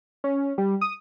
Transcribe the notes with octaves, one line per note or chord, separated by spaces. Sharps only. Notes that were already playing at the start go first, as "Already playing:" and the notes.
C#4
G3
D#6